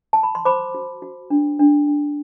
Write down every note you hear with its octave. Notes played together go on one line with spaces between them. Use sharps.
A5
B5
C6
C5 B5 D6
F#4
F#4
D4
D4
D4